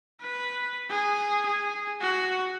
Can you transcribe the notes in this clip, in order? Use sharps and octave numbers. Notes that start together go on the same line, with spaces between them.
B4
G#4
G#4
F#4